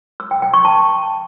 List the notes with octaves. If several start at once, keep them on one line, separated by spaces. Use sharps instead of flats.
E6
G5
G5
C#6
A5